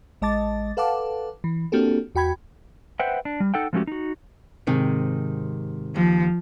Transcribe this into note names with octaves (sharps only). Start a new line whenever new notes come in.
A1 G#3 D#5 A5 D6 A6
A4 B4 F5 F#5 A5 D6
E3
A#3 C4 D4 F#4 G4 A4
E2 F#4 G5 B5 G#6
B4 C5 E5 F#5 G5
D4
G3
D#4 A4 F#5 G5
F3 G#3 A3 C#4 F#4 G4
D#4 F#4
G#2 C3 D#3
D#2 F3